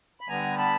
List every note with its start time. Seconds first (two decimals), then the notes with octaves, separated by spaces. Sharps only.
0.21 B5
0.28 D3 G3 B3 G#5 A#5
0.58 A5 B5